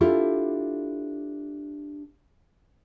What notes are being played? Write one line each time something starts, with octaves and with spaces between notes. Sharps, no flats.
D4 E4 F4 G4 A4